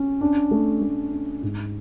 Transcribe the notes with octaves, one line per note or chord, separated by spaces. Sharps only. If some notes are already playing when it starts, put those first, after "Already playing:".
Already playing: C#4
D4
A3
A3
D4
G#2